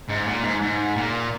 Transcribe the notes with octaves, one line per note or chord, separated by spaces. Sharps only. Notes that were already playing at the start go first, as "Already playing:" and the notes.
G#2
A#2
G#2
G#2
A#2